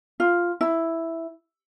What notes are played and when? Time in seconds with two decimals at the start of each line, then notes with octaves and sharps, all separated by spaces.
0.20 F4
0.61 E4